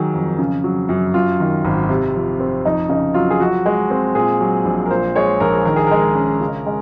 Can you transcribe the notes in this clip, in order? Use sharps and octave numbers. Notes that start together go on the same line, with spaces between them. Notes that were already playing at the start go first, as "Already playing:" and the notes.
Already playing: D#3 F#3 G#4
F2
C#3
F#3
F#2
F#2 F4
D#3
G#1
C3
F3
C4
F2 D#4
C#3 D#4
F#3 F4
G#4
F3 F#4
G#3
C4
A#2 G#4
F#3
A#1
A#4
A#2 C5
G#3 C#5
A#1 A#4
D#3 A#4
G#4
G#3 A#4
C#4
C#3
G#3